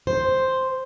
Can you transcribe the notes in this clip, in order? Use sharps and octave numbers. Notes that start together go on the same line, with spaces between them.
C5